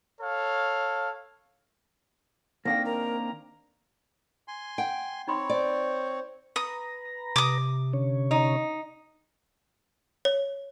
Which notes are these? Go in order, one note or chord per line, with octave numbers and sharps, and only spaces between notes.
A4 C#5 F5
D#3 A#3 C4 D4 F5 G5 A#6
A#4 A#5
G#5 C6
F#5 G5
C4 D#4 C#5 B5 C6
C5 D5
B4 A#5 D#6
C3 D6 D#6
D3 C#4 C#5
D#4
C#5